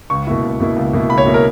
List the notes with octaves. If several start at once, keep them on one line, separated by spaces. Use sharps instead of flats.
C#2 C#6
B2 A#3 E4
C#2
B2 A#3 E4
C#2
B2 A#3 E4
C#2 B5
C#5
B2 A#3 E4
A#4